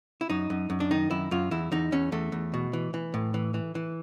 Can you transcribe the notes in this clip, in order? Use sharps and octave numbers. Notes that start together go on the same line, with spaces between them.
E4
F#2 D#4
F#2
F#2
D4
D#3 D#4
F#2 E4
F#2 F4
E2 E4
E2 D#4
E2 C#4
E2 A3
E2
B2
E3
E3
A2
E3
E3
E3